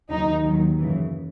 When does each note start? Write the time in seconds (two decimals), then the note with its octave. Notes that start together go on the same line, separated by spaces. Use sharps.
0.10 D#2 D#3 F#3 D#4
0.44 D#2 D#3 F#3
0.79 F#2 C#3 E3